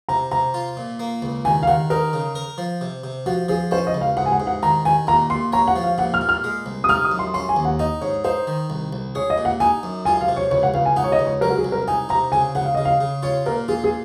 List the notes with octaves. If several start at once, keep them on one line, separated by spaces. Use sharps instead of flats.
C3 A#5
C3 A#5
F4
A#2
A#3
C#2
D#3 G#5
F5
D#3 F#5
D#4 A#4
C#3
A#4
F3
C3
C3
F3 F#4
F3 G#4
C#4 C5
D#5
C#2
F5
G#2 F#5
G#5
F#5
G#2
F#5
D#3 A#5
D#3 G#5
A#2 A#5
A#2 C6
C#5 A#5
F#5
F3
F5
A#2 F#5
F6
A#2
F6
G#3
C2
D#6
D#4 F6
D#6
F#2
C6
C#4 C6
G#5
D#2
F#5
D#4 D#5
G#2 C#5
D#4 C5
D#3
C2
C2
G#4 C#5
D#5
A#2
F#5
D#4 G#5
F#2
F4 G#5
F5
C3
C#5
C#2 C#5
F#5
C#2 F5
G#5
D#4 F#5
C#5
D#5
C#2
C#5
F#3 A#4
F#4
G#4
C2
A#4
D#4 G#5
C3 A#5
C#3 G#5
C#3 F#5
F5
C#3 D#5
F5
C#3
F4 C#5
A#2 A#4
F4 G#4
G#4